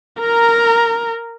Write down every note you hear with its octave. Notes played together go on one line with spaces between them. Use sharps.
A#4 A#5